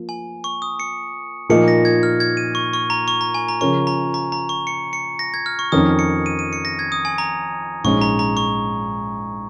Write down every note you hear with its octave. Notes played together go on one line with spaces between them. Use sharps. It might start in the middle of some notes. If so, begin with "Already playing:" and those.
Already playing: F3 A#3
G#5
C#6
D#6
C#7
A#2 F3 A#3 D#4 C#7
A#6
G#6
F6
G#6
D#7
C#6
C#6
A#5
C#6
A#5
G#5
A#5
C#3 F3 C#4 A#4 C#5 C#6
A#5
A#5
A#5
C#6
C#7
C#7
A#6
G#6
F6
C#6
F2 D#3 C#4 A#4 D#6
C#7
D#7
D#7
C#7
A#6
G#6
D#6
G#5
A#5
A#1 G#2 G#3 C#4 C#6
A#5
A#5
C#6